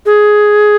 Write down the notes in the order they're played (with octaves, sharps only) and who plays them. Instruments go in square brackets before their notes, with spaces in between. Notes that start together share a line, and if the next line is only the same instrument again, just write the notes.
[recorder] G#4